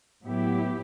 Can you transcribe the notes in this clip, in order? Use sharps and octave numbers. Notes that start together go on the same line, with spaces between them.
A2 F#3 B3 E4 G4